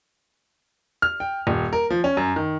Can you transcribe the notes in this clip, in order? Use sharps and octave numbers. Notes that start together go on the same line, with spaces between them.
F6
G5
D#1
A#4
F3
C#4
F#2
D#3